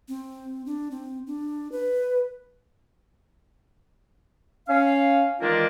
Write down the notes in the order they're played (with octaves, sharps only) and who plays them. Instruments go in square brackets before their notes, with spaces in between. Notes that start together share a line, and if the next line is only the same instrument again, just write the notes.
[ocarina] C4
D4
C4
D4
B4
[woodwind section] C#4 F5
D#3 E3 G#3 A#3 D4 F4